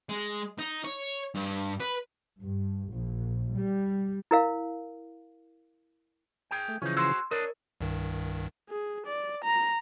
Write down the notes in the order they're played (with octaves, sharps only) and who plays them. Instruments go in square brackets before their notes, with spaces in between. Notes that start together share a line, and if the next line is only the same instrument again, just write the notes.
[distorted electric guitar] G#3
D#4
C#5
G2
B4
[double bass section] G2
A#1
G3
[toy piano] E4 A#4 F5
[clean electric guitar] G#4 G5
[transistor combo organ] A3
[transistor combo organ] C#3 E3 F3 [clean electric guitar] C#4 D#4
[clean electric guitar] F#4 G#4 C5 [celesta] C6 E6
[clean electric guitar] D4 D#5 [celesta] A#4 [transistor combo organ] C#5
[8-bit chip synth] C2 G2 D#3
[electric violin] G#4
D5
A#5